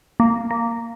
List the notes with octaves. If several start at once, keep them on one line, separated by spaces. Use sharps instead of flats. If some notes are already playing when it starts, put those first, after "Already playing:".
A#3
A#3